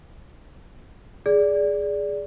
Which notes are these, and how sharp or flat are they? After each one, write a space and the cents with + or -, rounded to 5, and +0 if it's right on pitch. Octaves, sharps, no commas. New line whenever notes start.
G#4 +0 D5 -10